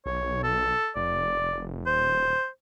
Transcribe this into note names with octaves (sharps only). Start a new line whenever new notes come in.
B1 C#5
A4
F1 D5
D#1 C5